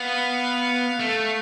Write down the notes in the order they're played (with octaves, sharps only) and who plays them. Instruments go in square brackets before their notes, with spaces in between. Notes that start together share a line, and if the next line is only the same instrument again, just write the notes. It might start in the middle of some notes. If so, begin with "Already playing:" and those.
Already playing: [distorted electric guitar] B3 [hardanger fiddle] F5
[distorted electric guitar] A3